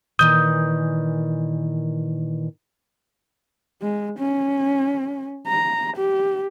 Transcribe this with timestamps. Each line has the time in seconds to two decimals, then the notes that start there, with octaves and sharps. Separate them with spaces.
0.19 A#2 D#3 E3 D#6 G6
3.82 G#3
4.19 C#4
5.48 A#5
5.97 G4